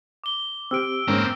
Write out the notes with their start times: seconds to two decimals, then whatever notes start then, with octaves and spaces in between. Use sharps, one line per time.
0.24 D6 G7
0.71 C4 G4 E6 F6 D7
1.08 G#2 A#3 C4 C#4 A#4